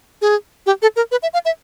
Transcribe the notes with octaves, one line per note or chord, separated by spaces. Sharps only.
G#4
G4
A4
A#4
B4
E5
F5
E5